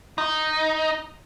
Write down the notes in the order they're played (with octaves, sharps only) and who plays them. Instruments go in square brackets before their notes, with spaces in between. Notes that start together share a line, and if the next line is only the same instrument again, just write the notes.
[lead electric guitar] D#4